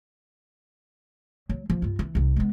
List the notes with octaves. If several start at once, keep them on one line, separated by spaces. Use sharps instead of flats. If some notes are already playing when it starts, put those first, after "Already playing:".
F#3
F3
G2 F4
E3
C2 D#4
G#3 B3